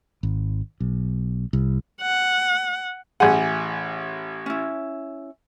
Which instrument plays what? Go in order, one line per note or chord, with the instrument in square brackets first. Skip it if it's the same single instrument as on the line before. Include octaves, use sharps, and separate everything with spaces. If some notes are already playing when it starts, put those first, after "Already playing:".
[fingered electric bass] G#1
B1
C2
[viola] F#5
[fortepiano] A1 F#5 [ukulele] G#4
[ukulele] C#4 E4